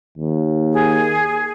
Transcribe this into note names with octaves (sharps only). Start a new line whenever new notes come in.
D#2
G#4